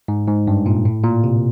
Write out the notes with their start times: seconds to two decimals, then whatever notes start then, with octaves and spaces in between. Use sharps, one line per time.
0.08 G#2
0.28 G#2
0.47 G2
0.66 A#2
0.85 A2
1.04 A#2
1.24 C3